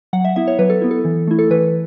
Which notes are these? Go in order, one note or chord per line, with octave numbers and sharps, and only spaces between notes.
F#3 F#5
E5
B3 E4 E5
C#5
F#3 B4
A4
B3 E4
A4
E3
A3 E4
A4
E3 B4